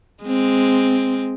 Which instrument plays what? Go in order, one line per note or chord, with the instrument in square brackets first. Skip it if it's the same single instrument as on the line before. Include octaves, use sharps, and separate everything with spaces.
[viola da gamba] G#3 C4